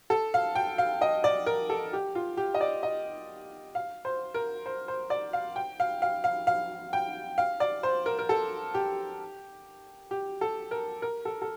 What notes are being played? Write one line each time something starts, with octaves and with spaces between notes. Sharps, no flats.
A4
F5
G5
F5
D#5
D5
A#4
A4
G4
F4
G4
D#5
D5
D#5
F5
C5
A#4
C5
C5
D5
F5
G5
F5
F5
F5
F5
G5
F5
D5
C5
A#4
A#4
A4
G4
G4
A4
A#4
A#4
A4
A4